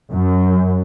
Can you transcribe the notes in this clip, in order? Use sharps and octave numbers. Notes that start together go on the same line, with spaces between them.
F#2